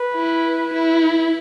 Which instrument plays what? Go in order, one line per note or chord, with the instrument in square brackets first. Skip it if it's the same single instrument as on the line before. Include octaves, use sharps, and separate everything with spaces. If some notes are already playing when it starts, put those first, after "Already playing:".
Already playing: [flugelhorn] B4
[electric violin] E4
E4